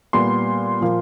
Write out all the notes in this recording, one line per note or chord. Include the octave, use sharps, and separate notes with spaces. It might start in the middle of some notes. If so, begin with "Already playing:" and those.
A#2 G3 B3 C6
A#2 F3 A#3